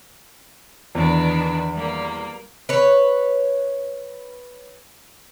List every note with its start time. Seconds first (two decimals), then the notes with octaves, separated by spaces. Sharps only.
0.95 E2 D#3 D4 B4
1.73 G3 A#3
2.69 B4 C#5